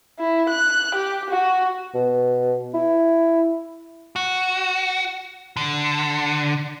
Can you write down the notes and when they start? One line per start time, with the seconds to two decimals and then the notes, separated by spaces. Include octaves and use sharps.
0.19 E4
0.50 F#6
0.95 G4
1.30 F#4
1.95 B2
2.74 E4
4.16 F#4
5.57 D3